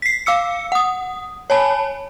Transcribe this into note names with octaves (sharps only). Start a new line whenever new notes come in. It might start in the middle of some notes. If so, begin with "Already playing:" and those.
B6 C7
F5 D6 E6 C#7
F#5 D#6
C#5 G#5 A5 B5